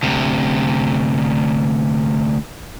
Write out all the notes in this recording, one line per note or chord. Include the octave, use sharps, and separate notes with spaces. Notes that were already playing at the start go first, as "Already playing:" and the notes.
D2 C3